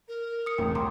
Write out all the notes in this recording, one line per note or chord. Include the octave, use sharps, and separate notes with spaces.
A#4
D#6 C#7
E1 E2 A2 C4 G5
C2 B2 G3 A#5 C6 D6